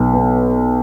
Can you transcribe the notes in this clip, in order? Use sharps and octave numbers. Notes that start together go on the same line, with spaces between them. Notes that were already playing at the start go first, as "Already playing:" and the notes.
Already playing: B1
B3